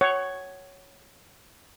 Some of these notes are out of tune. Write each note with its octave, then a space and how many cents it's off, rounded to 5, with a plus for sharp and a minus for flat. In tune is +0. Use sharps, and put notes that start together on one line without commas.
C#5 +0 F#5 +30